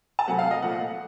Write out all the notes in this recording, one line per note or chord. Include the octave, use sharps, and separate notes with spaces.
A5
C3 F#3 A3 F#5
F5
D#5
A#2 F3 A3 F#5